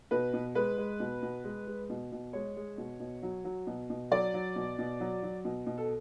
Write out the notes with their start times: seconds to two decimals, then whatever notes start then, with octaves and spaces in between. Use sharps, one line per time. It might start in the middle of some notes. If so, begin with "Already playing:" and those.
0.11 B2 B4
0.34 B2
0.55 G#3 B4
0.78 G#3
1.00 B2
1.22 B2
1.44 G#3
1.67 G#3
1.90 B2
2.12 B2
2.33 G#3 C#5
2.56 G#3
2.78 B2
3.00 B2
3.23 F#3
3.44 F#3
3.67 B2
3.90 B2
4.11 F#3 D5
4.34 F#3
4.56 B2
4.79 B2
5.00 F#3
5.23 F#3
5.45 B2
5.67 B2
5.78 A4